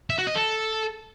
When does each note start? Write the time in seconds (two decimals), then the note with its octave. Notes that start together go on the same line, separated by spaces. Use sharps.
0.10 E5
0.18 F#4
0.27 D#5
0.35 A4